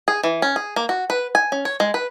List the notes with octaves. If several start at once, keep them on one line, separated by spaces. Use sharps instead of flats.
G#4
E3
C#4
G#4
A#3
F#4
B4
G#5
C#4
C#5
G#3
B4